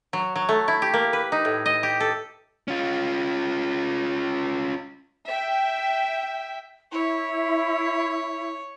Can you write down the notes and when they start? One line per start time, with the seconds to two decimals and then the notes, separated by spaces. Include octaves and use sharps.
0.13 F#3
0.36 F#3
0.49 A3
0.68 E4
0.82 G4
0.93 A#3
1.13 B4
1.32 D#4
1.45 A2
1.66 D#5
1.83 G4
2.00 A4
2.68 C#4 F4
5.27 E5 G5
6.92 E4 C#5